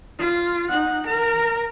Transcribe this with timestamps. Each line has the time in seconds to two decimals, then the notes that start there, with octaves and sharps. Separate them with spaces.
0.18 F4
0.69 D#4 F#5
1.06 A#4 A#5